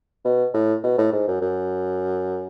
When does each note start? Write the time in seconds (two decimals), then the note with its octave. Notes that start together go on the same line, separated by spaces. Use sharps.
0.25 B2
0.54 A2
0.83 B2
0.98 A2
1.12 G#2
1.28 F#2
1.41 F#2